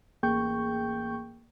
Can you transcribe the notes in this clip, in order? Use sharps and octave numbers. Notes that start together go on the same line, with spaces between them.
A1 A#3 G#4 G5 C#6 G6